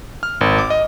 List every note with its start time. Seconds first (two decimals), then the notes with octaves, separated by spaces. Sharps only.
0.23 F6
0.41 G#1
0.58 D6
0.70 D#5